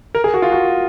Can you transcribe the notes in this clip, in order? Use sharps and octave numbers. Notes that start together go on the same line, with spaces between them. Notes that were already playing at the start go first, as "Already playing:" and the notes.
A#4
G#4
F#4
F4
F#4